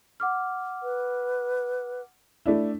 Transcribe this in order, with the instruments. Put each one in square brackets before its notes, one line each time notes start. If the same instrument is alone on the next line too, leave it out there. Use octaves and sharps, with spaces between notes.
[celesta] F#5 D6 F6
[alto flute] B4
[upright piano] A3 D4 E4